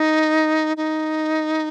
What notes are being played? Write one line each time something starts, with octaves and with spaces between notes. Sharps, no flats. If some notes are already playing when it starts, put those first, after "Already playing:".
Already playing: D#4
D#4